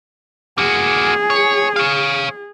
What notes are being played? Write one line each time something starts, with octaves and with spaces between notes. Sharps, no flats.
A#3 F#4 G#4
C#5
C#5 F5